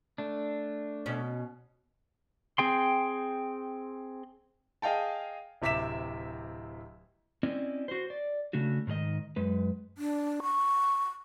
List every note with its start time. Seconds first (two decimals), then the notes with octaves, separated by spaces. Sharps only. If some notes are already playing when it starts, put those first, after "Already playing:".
0.18 A3 D4
1.06 B2 C#4
2.58 C4 G#4 G5 C6
4.82 G#4 D#5 F5 G5 A5
5.62 D1 C3 E5 D6 B6 E7
7.43 C4 C#4 E4 D5 D#5
7.88 F#4 C5
8.10 D5
8.53 C#3 A3 D4 F#4
8.87 G#2 D#3 G#4 D#5
9.36 F#2 G#3 B4
9.98 D4
10.43 C#6